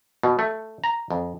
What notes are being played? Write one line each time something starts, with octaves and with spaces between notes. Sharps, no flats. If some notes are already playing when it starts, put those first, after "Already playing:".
B2
A3
A#5
F2